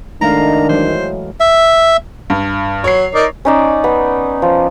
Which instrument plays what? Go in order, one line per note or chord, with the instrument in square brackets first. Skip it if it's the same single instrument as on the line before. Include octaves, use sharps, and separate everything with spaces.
[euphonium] D#3 [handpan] G#3 A3 F5 [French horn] D4 [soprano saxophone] A#5
[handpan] E3 F#3 G#3 [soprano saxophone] C5
[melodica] E5
[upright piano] G2
[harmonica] F#3 [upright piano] C#5 C7
[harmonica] D#4 A#4 D5
[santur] C#4 D#4 D5
B3
F3